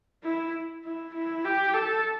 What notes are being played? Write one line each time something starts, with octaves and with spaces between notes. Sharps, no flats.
E4
E4
E4
G4
A4